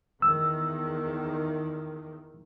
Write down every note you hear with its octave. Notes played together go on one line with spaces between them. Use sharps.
E2 D#3 E6